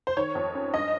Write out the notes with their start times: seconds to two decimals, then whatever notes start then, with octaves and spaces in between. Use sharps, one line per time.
0.07 C5
0.17 D#3 C#5
0.35 F2
0.55 C#4
0.74 G2 D#5